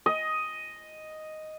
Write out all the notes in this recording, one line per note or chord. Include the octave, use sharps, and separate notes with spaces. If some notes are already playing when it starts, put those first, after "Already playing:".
D#5